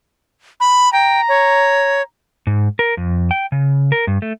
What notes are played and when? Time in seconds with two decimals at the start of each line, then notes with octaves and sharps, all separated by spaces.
0.60 B5
0.93 G5 A#5
1.29 C#5
2.47 G#2
2.79 A#4
2.97 F2
3.31 G5
3.52 C#3
3.92 A#4
4.07 G2
4.22 A3